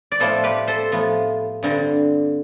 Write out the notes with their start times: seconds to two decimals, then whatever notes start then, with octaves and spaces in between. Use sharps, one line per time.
0.12 D5
0.20 A2 F3 B3 A4 C5
0.44 G4 B4
0.68 A4 C5
0.92 A2 F3 B3
1.63 G2 D3 G3 C4